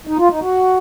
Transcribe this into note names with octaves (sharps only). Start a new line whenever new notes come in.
D#4
F4
D#4
F#4